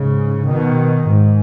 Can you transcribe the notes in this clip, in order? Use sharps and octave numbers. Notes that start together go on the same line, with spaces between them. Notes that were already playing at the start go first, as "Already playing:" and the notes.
Already playing: G#2 C#3
B2 D#3
G#2